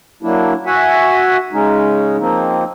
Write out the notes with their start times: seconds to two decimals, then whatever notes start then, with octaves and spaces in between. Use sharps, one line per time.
0.23 F#3 A#3 D4 E4
0.66 F#4 E5 F#5 G#5
1.53 C#3 G#3 C#4 D#4
2.19 F3 A#3 C4 D#4